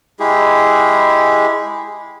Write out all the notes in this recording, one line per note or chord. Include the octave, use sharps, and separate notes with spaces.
G#3 E4 G4 G#4